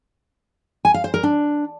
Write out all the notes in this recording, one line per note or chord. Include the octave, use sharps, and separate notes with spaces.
G#5
F5
C5
A#4
D4